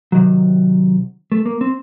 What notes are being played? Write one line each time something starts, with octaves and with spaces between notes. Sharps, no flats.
C3 D#3 F#3
A3
A#3
C4